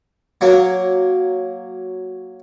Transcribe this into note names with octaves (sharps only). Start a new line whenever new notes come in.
F#3 A#3